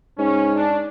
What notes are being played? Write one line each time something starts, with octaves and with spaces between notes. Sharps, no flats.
G#2 C#4
D4